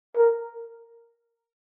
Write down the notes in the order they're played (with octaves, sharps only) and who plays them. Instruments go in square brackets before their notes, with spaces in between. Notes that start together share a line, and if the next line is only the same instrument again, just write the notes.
[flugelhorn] A#4